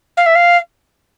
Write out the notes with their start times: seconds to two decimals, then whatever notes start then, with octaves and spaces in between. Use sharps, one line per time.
0.17 F5
0.26 E5
0.35 F5